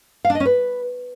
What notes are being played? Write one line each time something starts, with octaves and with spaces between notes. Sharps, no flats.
F5
D4
D#5
C#4
B4